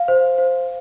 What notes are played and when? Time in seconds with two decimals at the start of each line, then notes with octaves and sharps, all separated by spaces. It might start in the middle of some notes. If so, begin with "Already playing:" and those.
Already playing: F5
0.08 C5
0.38 C5